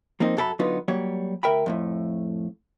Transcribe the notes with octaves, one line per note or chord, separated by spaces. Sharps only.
F3 A#3 C4 D#4
F#2 F#3 A4 B4 B5
D3 F#3 B3 D#4 F4 B4
F#3 G3 A#3 C#5
D2 A#4 E5 G5 B5
F2 A2 A3